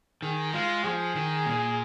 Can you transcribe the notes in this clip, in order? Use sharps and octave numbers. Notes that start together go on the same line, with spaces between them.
D#3 G#4
G#3 F4
F3 G#4
D#3
A#2